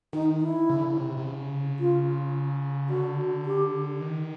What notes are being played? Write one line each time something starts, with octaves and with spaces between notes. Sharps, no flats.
D#3 D#4
E4
C#3
D3
C#3
C3
C3
C#3
F4
D3 F#4
G4
D#3